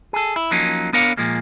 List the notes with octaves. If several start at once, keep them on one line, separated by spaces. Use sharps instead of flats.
G#4 A4
E4
F3 F#3 A#3 C#4 D#4
B3 D4 A#4 C#5 F5
A#2 F3 G#3 A#3